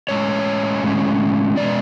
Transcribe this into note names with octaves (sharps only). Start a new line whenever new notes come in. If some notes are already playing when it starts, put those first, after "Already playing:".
A2 G#3 C#4 C#5
A2 G#3 C#4
B2 G#3 B3 D5